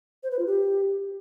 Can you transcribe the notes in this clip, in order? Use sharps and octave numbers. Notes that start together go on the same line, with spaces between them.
C5
B4
F4
G4